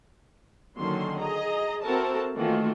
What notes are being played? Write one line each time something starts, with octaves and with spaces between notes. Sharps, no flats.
D3 D#3 F#3 A#3 C#4 C6
G#4 D#5 A#5
C4 E4 F#4 A4 A#4 A5
D#3 E3 A3 A#3 F4 F#4